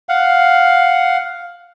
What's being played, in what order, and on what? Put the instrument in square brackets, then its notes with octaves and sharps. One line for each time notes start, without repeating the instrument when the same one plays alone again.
[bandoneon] F5 F#5